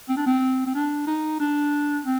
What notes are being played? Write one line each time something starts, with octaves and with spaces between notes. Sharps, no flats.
C4
D4
C4
C4
D4
D#4
D4
C4